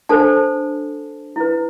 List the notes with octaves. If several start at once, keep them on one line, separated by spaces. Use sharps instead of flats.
D4 A4 C5 A5
E4 B4